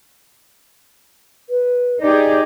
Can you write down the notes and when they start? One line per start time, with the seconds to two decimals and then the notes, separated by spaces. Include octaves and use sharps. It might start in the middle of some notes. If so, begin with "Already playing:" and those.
1.49 B4
2.02 D#4 G4 G#4 D5